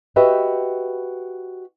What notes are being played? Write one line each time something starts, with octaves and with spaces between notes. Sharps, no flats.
F#4 G4 B4 D#5 E5